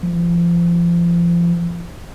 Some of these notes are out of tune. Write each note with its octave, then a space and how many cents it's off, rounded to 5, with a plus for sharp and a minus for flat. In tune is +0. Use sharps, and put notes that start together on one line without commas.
F3 -30